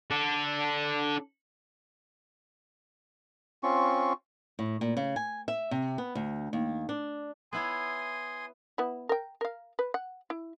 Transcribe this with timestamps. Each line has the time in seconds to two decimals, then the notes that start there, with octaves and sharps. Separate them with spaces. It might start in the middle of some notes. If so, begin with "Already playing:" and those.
0.10 D4 A4
3.63 C4 C#4 F4 C#6
4.59 A2
4.81 A#2
4.97 C#3
5.16 G#5
5.48 E5
5.71 C3
5.98 B3
6.15 D2
6.53 D#2
6.89 D4
7.53 B3 E4 C#5 G#5 C6 D#6
8.78 B3 E4
9.09 A#4 G5
9.41 A#4 F5
9.79 B4
9.94 F#5
10.30 E4